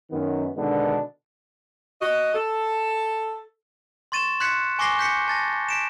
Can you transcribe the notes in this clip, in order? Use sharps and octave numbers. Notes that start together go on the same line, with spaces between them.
F#2 D#3 B3
B2 D3 D#3 G#3 B3 D4
F#4 D#5
A4
C6 C#6 A6 D#7 E7
C6 F#6 G#6 B6 C#7
G#5 C#6 D6 A#6 C7 G7
G6 B6 C#7
A5 A6 A#6
B6 D7 E7